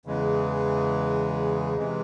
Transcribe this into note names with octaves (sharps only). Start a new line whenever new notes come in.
E2 C#3 E3 G#3
C3 E3 G#3